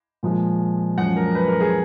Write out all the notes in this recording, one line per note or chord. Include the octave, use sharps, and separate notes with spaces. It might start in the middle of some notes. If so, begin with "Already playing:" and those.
A#2 F3 G#3
F#2 F3 G#3 F#5
A#4
B4
A#4
G#4